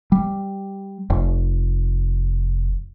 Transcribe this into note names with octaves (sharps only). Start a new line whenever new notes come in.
G3
F1